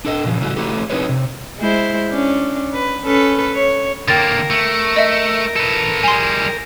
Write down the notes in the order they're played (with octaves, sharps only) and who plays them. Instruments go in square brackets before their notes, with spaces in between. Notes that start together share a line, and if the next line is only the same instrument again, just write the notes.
[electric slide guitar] D4 A4 D#5
A#2 C#3 F3 F#3
A2 C#3 G3 A3 E4 F#4
A3 E4 F#4 G4 A4
C4 D#4 E4 G#4 B4 C#5
C3
[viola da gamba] G#3 E4 C5
C#4 D4
B4
C#4 A4 B4
C#5
[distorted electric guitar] D3 A#3 [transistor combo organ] A#4 [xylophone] G5 A6
[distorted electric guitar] A3
[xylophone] D#5 E5
[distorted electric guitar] A4 B4
[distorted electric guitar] G3 G#4 [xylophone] G#5 C6